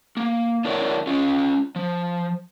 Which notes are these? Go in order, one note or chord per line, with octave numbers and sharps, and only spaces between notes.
A#3
D4 E4 A#4 C#5 D#5 E5
C#4 F4
F3